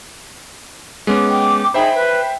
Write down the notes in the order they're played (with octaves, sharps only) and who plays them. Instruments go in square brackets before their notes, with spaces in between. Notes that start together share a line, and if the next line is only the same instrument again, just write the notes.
[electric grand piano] G#3 B3 C#4 [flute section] D6
[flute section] G5 D6
[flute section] D#4 G#4 B5 [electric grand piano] C5 E5 G5
[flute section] B4